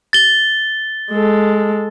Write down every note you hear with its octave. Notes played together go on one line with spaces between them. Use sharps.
A6 G7
G#3 A4